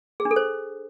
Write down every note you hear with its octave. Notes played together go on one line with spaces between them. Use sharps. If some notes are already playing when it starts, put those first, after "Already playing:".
G#4
D4
A4
C5